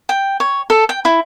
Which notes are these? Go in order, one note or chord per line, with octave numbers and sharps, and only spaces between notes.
G5
C#5
A4
G5
E4